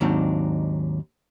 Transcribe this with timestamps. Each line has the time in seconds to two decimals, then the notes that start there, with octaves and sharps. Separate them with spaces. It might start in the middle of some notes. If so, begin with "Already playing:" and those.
0.01 D#2 G#2 F#3 C4 D4 D#4